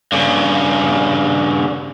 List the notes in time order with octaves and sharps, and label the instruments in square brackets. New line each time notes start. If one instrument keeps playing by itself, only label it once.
[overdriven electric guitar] G2 C#3